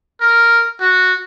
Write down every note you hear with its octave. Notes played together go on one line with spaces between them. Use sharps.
A#4
F#4